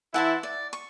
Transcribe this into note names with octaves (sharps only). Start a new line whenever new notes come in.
E3 E4 F#5 A5 C6
D5
C#6